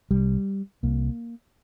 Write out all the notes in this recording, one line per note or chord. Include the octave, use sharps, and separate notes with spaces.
C2 C3 G3
C2 C3 A#3